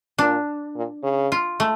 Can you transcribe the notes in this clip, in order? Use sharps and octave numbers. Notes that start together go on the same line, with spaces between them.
A#2 D4
A#2
C#3
F4
A3